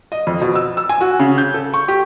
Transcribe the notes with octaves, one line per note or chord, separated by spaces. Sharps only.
D#5
F2
B2
E6
E6
G#5
F#4
C#3
G6
A4
C#6
G4